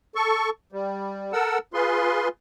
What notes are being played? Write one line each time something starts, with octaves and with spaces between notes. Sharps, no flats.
A4 C#6
G3
A4 A#4 F#5 E6
F4 G#4 B4 C6